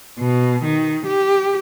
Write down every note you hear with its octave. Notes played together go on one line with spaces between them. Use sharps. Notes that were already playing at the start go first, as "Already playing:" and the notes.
B2
D#3
G4